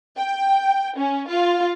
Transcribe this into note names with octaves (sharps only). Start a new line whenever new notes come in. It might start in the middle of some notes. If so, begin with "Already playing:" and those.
G5
C#4
F4